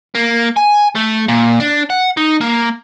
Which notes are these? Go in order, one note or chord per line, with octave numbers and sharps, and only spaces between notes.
A#3
G#5
A3
A#2
D4
F#5
D#4
A#3